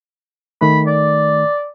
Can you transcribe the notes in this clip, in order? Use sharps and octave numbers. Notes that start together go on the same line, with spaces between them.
D#3 A3 B5
D5